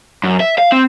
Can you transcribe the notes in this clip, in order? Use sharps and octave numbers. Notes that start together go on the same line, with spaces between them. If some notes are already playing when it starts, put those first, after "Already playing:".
F#2
E5
F5
C4